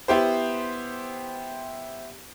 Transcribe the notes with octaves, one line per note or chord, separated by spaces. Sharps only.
B3 E4 G4 C5